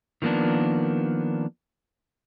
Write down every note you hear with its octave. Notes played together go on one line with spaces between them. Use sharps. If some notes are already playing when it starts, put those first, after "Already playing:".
D#3 F3 A#3 B3 D4